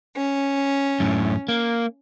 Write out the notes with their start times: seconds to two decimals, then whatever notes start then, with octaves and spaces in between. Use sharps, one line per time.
0.17 C#4
1.00 F#2 A2
1.49 A#3